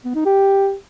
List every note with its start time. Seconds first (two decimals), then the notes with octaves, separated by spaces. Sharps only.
0.05 B3
0.15 D#4
0.25 G4